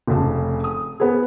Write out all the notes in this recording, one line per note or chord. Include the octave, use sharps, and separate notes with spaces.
F1 C#3 A5
D#6
B3 G#4